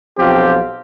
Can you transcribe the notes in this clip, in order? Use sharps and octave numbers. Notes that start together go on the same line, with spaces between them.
B1 F3 C4 F4 G4